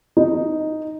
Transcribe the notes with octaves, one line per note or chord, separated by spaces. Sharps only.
D#4